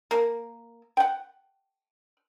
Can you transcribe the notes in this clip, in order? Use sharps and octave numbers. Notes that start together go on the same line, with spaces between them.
A#3
F#5 G5